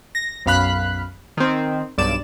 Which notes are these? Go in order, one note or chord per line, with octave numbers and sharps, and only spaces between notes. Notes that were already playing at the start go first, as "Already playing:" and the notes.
A#6
B1 F#2 F5 B5 F#6
D#3 C4
B1 G2 D5 E7